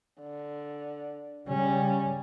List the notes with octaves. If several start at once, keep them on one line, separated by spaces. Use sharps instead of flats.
D3
C#3 G3 C#4